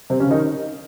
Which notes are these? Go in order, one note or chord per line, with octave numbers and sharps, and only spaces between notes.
C3 C4
C#3 C#4
D#3 D#4